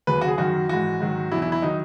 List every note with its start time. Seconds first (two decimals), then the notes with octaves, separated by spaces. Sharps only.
0.07 D#2 C#3 F#3 B4
0.21 F#4
0.28 G#4
0.38 F#2 D#3 F#3 F#4
0.69 G#2 E3 F#4
1.00 G#2 D#3 F#3
1.31 E2 B2 F#3 E4
1.42 E4
1.52 E4
1.62 D#3 F#3 D#4